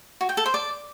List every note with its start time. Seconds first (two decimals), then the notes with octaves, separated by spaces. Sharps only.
0.21 F#4
0.29 G5
0.37 A4
0.46 C5
0.54 D5